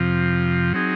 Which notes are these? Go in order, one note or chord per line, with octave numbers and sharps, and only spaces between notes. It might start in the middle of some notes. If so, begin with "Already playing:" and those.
Already playing: F2 C3 F3
F#3 C4 D#4 G#4